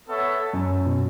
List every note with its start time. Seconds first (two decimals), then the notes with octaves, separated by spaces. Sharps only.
0.09 B3 A4 C#5 E5
0.53 F#2
0.86 B2